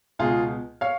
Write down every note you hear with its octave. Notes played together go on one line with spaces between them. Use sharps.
C#2 B2 F4 G#4
C#5 F5